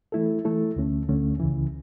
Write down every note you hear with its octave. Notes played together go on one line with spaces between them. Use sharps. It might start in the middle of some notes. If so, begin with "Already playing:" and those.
E3 A3 E4 A4
E3 A3 E4 A4
D2 D3 A3 C#4
D2 D3 A3 C#4
C#2 C#3 E3